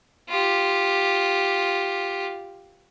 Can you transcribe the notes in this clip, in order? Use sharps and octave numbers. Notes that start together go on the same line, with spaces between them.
F4 G4